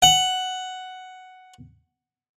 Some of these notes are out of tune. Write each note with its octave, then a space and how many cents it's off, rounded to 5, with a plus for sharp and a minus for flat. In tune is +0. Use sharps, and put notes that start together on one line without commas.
F#5 +5